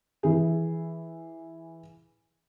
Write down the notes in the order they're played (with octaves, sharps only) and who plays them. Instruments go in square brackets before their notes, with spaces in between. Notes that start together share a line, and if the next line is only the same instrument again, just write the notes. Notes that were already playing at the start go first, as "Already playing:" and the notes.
[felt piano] E3 G#4